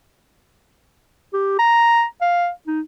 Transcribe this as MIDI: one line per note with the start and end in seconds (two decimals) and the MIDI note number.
1.34 1.57 67
1.59 2.05 82
2.21 2.50 77
2.67 2.81 63